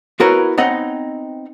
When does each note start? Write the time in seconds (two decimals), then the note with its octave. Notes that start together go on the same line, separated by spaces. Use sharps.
0.20 B3 E4 F#4 A#4 B4 C#5
0.58 B3 C4 D#4 C#5 D#5 F#5